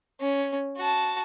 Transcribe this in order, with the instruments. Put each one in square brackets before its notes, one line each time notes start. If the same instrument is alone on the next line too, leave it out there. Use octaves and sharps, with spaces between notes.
[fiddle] C#4
F#4 A5